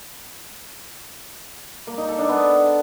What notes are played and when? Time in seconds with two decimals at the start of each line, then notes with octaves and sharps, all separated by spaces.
1.87 A#3
1.98 D#4
2.08 A4
2.19 D4
2.29 B3